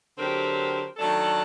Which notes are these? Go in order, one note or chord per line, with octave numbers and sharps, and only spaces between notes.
D3 F#3 C4 G4 A#4
D#3 F#3 A3 D4 A4